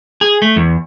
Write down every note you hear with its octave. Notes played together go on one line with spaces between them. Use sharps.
G#4
A3
E2